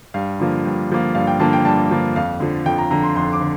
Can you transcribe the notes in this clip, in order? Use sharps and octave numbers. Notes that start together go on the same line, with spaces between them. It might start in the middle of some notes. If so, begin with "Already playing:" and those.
G2 F5
D3 F3 A#3
G2
D3 F3 A#3
G2 F5
G5
D3 F3 A#3 A5
G5
G2 A5
D3 F3 A#3
F2 F5
D3 F3
F2 G5
A#5
D3 F3 A#5
C6
F2 C6
D6
D3